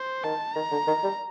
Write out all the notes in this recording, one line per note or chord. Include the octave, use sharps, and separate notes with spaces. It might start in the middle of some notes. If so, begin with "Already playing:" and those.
Already playing: C5
D#3 A5
D#3 A#5
D3
D#3
G3